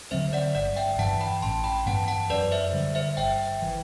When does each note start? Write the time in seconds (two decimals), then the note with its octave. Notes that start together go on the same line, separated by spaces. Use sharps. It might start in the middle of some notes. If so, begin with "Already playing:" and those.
0.11 D3 F#3 C4 C5 E5
0.33 D5 F#5
0.55 G1 D5 F#5
0.76 E5 G5
0.99 G2 E3 B3 F#5 A5
1.21 G5 B5
1.42 A1 A5 C6
1.64 G5 B5
1.86 G2 E3 B3 F#5 A5
2.08 F#5 A5
2.30 F#2 B4 D5
2.52 C5 E5
2.73 D3 G3
2.95 C5 E5
3.17 G1 E5 G5
3.62 E3